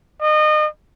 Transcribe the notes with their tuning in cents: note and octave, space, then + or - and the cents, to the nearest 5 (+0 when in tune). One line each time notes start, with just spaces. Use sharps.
D#5 -30